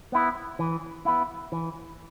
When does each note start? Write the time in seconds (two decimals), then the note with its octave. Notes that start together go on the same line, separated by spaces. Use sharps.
0.12 B3 E4
0.59 E3
1.05 B3 E4
1.52 E3